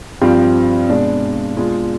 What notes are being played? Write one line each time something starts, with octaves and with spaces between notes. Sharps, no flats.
G2 F3 C4 G4
B2 G#3 D4
B2 G#3 D4 F4